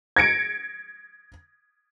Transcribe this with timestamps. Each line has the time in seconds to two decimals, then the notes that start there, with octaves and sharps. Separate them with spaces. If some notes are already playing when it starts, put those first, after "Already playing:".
0.16 G#6 A#6 C#7 D7